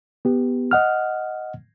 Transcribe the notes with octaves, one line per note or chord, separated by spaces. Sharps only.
B3 G4
D#5 F#5 F6